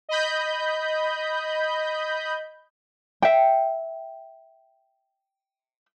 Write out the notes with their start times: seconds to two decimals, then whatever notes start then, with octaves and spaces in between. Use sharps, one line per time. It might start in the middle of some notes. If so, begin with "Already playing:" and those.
0.09 D#5 B5 G6
3.22 E5 G5